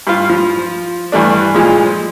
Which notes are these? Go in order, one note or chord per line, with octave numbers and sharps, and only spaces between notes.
G2 F4
F3
G2 E3 A3 D4
A#2 F3 G#3